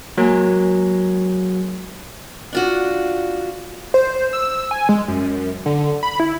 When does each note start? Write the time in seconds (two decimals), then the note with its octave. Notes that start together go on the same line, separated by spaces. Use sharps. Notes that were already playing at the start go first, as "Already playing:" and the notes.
0.18 F#3 G#3 A#3
2.53 D4 F4 F#4
3.94 C5
4.33 E6
4.71 G#5
4.89 G#3
5.08 F#2
5.66 D3
6.03 B5
6.20 E4